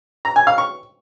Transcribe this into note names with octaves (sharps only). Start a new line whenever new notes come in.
A#5
G#5
F5
C#6